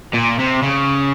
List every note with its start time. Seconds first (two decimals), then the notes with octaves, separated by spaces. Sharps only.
0.13 A#2
0.39 C3
0.62 C#3